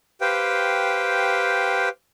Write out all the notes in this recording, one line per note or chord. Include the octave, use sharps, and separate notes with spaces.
G4 B4 C5 F5 G5